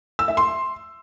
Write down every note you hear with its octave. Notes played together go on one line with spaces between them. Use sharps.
E6
E5
C6